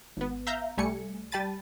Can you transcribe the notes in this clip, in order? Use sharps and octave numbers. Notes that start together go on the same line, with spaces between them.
G#1 B3
E5 F5 A#5 G6
C2 G3 A3 G#5 C#7
G3 G5 A5 B5 A6 D#7